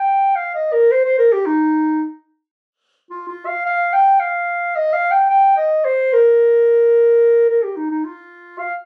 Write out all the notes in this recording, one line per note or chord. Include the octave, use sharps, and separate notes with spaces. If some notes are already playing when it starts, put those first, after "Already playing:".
Already playing: G5
F5
D#5
A#4
C5
C5
A#4
G4
D#4
F4
F4
F5
F5
G5
F5
D#5
F5
G5
G5
D#5
C5
A#4
A#4
G4
D#4
D#4
F4
F5